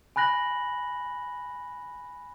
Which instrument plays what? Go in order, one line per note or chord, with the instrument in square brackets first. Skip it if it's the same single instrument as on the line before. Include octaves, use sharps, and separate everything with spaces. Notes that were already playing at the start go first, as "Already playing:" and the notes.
[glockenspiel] G#5 B5 F#6 A#6 F#7